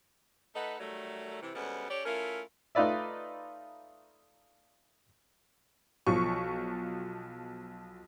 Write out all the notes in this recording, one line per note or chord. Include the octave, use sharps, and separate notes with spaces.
A3 D#4 A4 B4 D#5 F#5
D#3 F#3 G3 A3
C3 E3
D2 G3 G#3 B3 C#4 F#5
C#4 G4 A4 C#5 D5
A3 C#4 E4 F4 A#4
A3 D#4 F4 B4 D5 E5
B1 F3 C#6